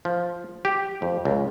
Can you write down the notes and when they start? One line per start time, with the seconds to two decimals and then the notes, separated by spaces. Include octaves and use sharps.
0.05 F3
0.65 G4
1.02 F2
1.25 C#2